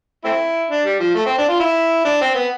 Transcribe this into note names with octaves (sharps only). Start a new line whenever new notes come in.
A3 C4 E4
D4
G3
F3
A3
C4
D4
F4
E4
D4
C4
B3